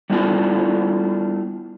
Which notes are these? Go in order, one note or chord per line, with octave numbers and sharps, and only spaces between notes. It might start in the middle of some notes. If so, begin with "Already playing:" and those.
G3 A3 B3 D4 E4 F4